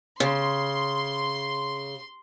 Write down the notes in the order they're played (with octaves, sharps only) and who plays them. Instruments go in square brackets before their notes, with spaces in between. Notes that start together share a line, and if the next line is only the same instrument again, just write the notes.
[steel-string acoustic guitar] C#3 [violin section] C6